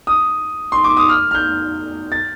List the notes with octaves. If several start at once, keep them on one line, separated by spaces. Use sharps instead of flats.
D#6
C6
D6
D#6
F6
F6
G6
A6